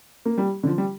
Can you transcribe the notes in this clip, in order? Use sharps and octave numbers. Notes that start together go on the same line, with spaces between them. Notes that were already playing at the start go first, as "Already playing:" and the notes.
A#3
G3
D3
F3
G3